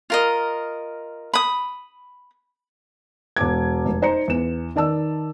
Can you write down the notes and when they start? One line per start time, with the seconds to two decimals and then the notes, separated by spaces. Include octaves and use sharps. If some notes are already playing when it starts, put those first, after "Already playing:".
0.10 F4 A#4 D#5
1.33 B5 D#6
3.37 E1 D6 G#6
3.85 F1
4.02 D#4 C5 A#5 C#7
4.28 E2 E7
4.76 D#3 D5 A5 E6